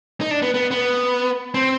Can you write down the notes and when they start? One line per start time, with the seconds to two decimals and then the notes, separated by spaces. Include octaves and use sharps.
0.21 D#4
0.31 D4
0.42 B3
0.54 B3
0.71 B3
1.54 C4